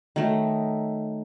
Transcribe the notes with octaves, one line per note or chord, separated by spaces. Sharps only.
D#3 F#3 A3 D#4